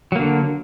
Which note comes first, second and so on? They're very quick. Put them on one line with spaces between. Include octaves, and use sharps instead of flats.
F#3 A#3 D3